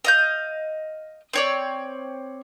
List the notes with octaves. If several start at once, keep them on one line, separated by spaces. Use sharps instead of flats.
D#5 F5 G6
C4 C#5 D5